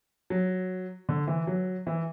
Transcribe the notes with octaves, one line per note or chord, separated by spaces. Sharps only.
F#3
D3
E3
F#3
E3